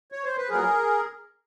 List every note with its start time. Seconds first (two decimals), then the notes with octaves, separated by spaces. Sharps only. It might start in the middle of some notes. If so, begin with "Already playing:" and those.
0.12 C#5
0.24 C5
0.37 B4
0.49 A#2 F#3 B3 G#4 A#4